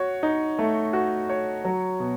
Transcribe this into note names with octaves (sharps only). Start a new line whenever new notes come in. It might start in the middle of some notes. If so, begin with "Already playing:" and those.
Already playing: F#4 C#5
D#4
A3
F#4
C#5
F#3
B2